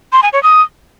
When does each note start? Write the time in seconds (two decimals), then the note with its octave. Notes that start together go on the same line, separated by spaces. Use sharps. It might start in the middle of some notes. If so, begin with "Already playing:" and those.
0.13 C6
0.23 G#5
0.33 C#5
0.43 D#6